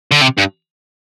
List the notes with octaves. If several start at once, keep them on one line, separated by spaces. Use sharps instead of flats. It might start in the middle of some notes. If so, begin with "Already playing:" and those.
D3
C3
G2